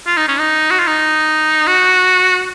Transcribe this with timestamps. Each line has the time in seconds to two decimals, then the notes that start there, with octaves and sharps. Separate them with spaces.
0.07 F4
0.17 D#4
0.29 C#4
0.39 D#4
0.71 F#4
0.79 F4
0.87 D#4
1.68 F#4